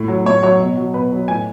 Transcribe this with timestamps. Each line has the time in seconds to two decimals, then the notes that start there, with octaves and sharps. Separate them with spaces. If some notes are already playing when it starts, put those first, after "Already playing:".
Already playing: A2
0.08 F#3
0.25 A2 C#5
0.43 F#3 C#5
0.60 B2
0.77 F#3
0.94 B2 B4
1.12 F#3
1.28 A2 G#5